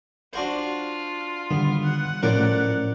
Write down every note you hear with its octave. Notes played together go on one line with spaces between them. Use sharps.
D4 F4 F#4 C5
D3 D#3 G3 B3
F#5
A2 F3 C#4 A#4 C5 D5